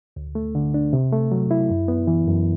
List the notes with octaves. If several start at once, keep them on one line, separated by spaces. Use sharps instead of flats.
D2
A3
D3
D4
C3
A3
F#3
E4
F#2
B3
E3
F#2